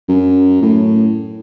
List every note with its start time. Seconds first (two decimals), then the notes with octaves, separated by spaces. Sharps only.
0.08 F#2
0.62 A2